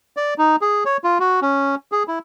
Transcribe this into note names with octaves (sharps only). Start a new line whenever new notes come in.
D5
D#4
G#4
C#5
F4
F#4
C#4
G#4
E4